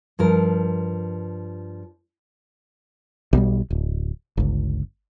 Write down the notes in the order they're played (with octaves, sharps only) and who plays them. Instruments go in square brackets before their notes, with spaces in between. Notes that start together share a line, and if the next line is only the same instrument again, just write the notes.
[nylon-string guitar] G2 F3 A#4
[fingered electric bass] B1 B2 G3
D1
G1 C#2